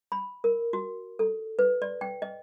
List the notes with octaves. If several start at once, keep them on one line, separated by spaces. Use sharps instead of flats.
B5
A#4
F#4
A4
B4
D5
G5
D#5